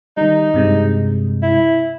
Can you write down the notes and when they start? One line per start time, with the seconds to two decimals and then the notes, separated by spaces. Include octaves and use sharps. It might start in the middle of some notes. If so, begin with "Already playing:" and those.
0.17 D#3 G3 D#4
0.54 G2 C3 G#3
1.43 E4